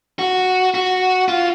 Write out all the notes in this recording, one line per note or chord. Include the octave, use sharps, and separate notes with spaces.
F#4
F#4
F4